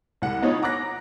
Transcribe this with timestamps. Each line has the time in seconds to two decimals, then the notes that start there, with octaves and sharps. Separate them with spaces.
0.22 C2 F#5
0.42 B3 D#4 F4 C#5
0.62 F#5 A#5 D6 F#6 A#6